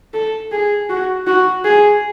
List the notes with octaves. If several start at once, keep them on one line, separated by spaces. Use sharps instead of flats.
A4
G#4
F#4
F#4
G#4